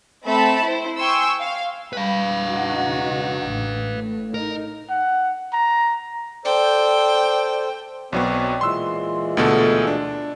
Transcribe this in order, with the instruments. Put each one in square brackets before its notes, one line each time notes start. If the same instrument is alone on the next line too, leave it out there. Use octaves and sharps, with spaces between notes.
[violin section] A3 C4 E5 A5 B5
E4 C5
G5 G#5 C6 C#6 E6
F5
[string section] G3 G5 B5 [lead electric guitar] B4 F5
[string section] C#3 D#4 F#4
A1
A2
[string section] D#4 [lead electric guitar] A#4
[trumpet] F#5
A#5
[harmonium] A4 C5 [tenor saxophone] D5 [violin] G5
[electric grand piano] B1 F#3 B3 [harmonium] C4 C#5 D5
[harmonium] A#2 E3 G#3 [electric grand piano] C6 E6
[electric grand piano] D2 B2 A4
D4